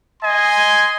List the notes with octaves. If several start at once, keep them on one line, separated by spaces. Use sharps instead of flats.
D#5 G#5 C6